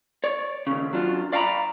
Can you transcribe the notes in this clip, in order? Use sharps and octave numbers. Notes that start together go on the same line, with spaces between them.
C#5 D5
D#2 C#3
F#3 D4 F4
D5 F5 G5 G#5 A#5 B5